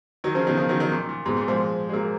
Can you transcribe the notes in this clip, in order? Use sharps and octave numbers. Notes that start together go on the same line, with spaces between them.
D#3 F#3
C#3 F3
B2 D#3
C#3 F3
D#3 F#3
D#3 F#3
A#2
A#2
G#2 B2
A#2
F3 G#3
G#3
F#3 A#3